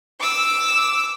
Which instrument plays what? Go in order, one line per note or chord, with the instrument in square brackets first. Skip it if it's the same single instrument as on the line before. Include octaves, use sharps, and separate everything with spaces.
[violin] D6 E6